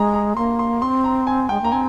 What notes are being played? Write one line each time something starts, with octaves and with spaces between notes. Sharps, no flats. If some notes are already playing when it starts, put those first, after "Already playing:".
Already playing: G#3 A#5
A#5
A#3 C6
C6
C4 C6
A#5
G#5
G#3 G5
A#3 A#5
C4 G#5